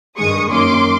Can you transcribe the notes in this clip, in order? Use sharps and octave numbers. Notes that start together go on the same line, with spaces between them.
G2 D#3 G#3 C#6 D#6
F#2 D#3 F#3 A#3 C#4 C6 D6